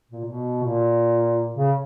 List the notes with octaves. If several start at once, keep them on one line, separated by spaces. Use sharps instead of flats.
A#2
B2
A#2
C#3